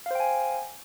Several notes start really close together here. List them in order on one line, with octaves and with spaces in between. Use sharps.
F5 C5 G5 G#5